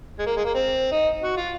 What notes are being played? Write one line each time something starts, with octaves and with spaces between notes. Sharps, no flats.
G#3
A#3
G#3
A#3
C4
D#4
F#4
F4